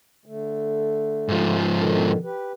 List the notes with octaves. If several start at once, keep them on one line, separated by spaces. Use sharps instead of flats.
D3 A3
G#2 F3
B2 D3 D#3
G4 B4